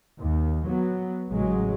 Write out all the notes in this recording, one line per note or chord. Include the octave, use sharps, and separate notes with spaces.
D#2
F#3 B3
A1 C#3 F#3 G#3